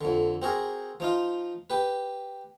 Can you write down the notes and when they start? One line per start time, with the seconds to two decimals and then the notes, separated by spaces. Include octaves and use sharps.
0.01 F2 D3
0.42 C4 F#4 G#4 A#4
1.00 F3 D#4 F4
1.70 G4 B4